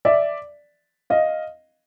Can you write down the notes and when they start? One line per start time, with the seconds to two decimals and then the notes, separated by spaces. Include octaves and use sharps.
0.05 D5 E5
1.10 D#5 F5